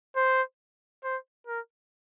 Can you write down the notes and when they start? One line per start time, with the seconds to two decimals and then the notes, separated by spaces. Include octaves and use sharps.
0.16 C5
1.04 C5
1.47 A#4